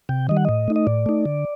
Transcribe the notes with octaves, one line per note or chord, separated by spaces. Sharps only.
C3 G5
D#3 G3 D#5
F#5
A2 D#5
A3 D#4
D#5
A2 D5
A3 D#4
D3